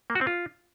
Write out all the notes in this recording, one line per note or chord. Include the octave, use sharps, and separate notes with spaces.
A#3
F#4
C4
F4